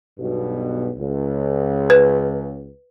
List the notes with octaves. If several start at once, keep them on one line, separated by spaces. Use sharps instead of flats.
B1 G2 B2
C#2
B4